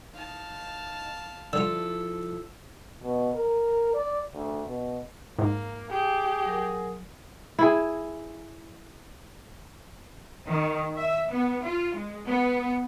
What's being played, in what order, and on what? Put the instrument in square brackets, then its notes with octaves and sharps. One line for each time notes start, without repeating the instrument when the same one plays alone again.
[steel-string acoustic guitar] D#4 [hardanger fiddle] F5 A5
[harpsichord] D3 F4 [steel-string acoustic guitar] F3 E4 A4 [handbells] E6
[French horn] B2
A#4
D5
D2
B2
[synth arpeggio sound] G#2 [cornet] A#3
[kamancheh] G4 [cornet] G#4
[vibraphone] F#3 A#4
[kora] E4 G#4
[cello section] D#3
E5
B3
F4
G#3
B3